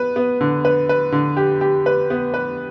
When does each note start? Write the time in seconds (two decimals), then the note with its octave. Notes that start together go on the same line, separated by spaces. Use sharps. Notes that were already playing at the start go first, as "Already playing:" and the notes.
Already playing: B3 B4
0.16 B3
0.41 D3
0.65 B4
0.89 B4
1.12 D3
1.37 G4
1.61 G4
1.86 B4
2.10 B3
2.34 B4